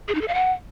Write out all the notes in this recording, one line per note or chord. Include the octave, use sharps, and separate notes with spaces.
G#4
D#4
A4
F5
F#5